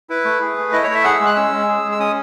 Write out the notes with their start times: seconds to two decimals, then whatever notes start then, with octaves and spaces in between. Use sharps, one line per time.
0.10 E4 B4
0.25 A3
0.41 G#4
0.58 A3
0.72 E4 D#5
0.83 C#5
0.89 A3 E5
1.04 G#4 F#5
1.15 E6
1.20 G#3
1.26 F#6
1.36 C#4 E6
1.52 G#3
1.68 G#4
1.85 G#3
1.92 E6
1.99 C#4 D#6